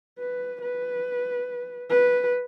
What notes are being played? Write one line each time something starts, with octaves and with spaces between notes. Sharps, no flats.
B4
B4
B4